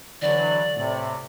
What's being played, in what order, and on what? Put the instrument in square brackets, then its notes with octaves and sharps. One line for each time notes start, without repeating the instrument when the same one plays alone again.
[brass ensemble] D3 E3 F#3 [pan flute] D5
[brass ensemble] A2 C3